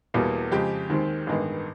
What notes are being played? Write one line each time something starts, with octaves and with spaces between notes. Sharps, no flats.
E1 E2 B2 G3 A#3
F2 C#3 F3 G#3 G4
D#2 D#3 G#3 C4
A1 G2 D#3 G#3 B3